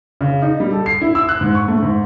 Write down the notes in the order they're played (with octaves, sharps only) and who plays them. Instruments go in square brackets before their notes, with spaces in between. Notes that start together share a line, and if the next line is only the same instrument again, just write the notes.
[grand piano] C#3
D#4
G3
A4
C7
E4
E6
F#6
G#2
C#6
A3
G#2